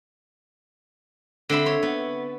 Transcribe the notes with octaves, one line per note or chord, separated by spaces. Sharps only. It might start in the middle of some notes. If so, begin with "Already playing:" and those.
D3 C4 E5 B5
C#5 C6
B3